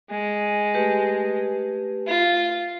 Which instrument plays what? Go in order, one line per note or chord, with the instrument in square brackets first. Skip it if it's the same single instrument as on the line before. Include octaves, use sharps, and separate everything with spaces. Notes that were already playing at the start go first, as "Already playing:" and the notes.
[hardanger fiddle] G#3
[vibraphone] A3 G4 B4
[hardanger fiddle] F4